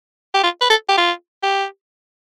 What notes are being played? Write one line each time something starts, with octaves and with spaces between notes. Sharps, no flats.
G4
F4
B4
A4
G4
F4
G4